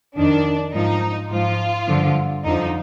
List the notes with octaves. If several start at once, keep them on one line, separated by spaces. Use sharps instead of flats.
F2 D#3 D4
G#2 F3 D#4
G#2 F3 F4
G2 D3 F3
F2 D3 F3 D#4